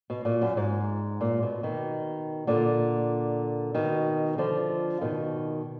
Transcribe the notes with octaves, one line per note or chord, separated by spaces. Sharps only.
B2
A#2
F#2
G#2
A#2
B2
B2 D#3
A#2 D3
B2 D#3
D3 F3
B2 D#3